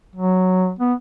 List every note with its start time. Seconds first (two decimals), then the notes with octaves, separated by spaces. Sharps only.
0.15 F#3
0.79 B3